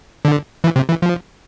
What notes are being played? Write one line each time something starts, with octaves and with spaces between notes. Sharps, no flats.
D3
E3
C3
E3
F3